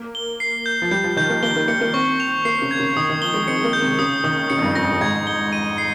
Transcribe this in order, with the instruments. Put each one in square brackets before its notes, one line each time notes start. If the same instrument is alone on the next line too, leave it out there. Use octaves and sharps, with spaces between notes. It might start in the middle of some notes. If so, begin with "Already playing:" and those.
Already playing: [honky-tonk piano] A#3
[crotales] G7
C7
G6
[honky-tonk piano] F3
[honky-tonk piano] G3 [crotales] G6
[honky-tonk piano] F3
[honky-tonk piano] D#3 [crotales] G6
[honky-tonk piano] A#3
[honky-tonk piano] A#3 [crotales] G7
[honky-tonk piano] A#3
[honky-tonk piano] A#3 [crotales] C#7
[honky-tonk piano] A#3
[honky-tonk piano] C4 [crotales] C#6
[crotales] F7
[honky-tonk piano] A#3 [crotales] C7
[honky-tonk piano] C#3
[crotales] G#6
[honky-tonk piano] C#3
[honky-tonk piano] D#3 [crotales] D#6
[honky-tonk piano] D#3
[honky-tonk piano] F3 [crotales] G7
[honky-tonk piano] G#3
[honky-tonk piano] C4 [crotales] C#7
[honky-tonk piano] A#3
[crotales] G6
[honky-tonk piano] C3
[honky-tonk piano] C#3 [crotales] D#6
[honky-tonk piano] D#3 [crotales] D#6
[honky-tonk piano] C#3 [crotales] C#7
[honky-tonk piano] F2
G2
[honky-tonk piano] F2 [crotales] A#6
[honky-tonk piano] G2
[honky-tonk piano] G#2 [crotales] G#6
[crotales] G7
D#7
C7